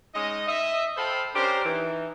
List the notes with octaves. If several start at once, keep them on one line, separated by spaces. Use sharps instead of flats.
G#3 C#4 D#4 D#5
D#5 E5
A4 C5 F5 G5 A5 B5
C#4 D4 G4 A#4 C5
E3 D#4